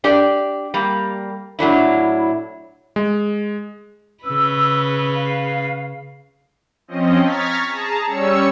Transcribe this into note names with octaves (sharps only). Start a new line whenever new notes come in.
D4 G4 D5
G3 A#3
A2 F#3 D4 E4
G#3
C#3 B4 E6
F5
F3 C4 C#4 D#5
A#5 C#6 F6 G#6 A6 B6
G#4 A5 A#5
G3 C#4 C#5 E6 C#7